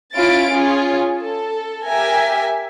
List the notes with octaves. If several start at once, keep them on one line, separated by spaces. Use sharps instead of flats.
C#4 E4 F4 F5 A6 D7
C#4 F4 G#4
A4
G4 A#4 E5 G#5